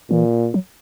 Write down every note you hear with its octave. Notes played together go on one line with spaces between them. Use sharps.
A#2 E3
F#3